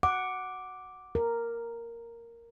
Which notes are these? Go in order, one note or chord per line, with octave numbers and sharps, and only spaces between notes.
F#5 D6
A#4